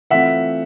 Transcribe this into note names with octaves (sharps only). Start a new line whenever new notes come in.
E3 A3 C4 F4 E5 F#5